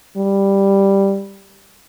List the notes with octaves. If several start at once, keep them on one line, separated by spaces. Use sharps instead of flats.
G3